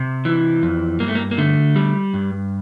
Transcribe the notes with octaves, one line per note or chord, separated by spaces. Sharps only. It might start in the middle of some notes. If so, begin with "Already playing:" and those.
Already playing: C3
E3
F2
G2 A#3
A3
A#3
A#3
D3 A3
G3
G2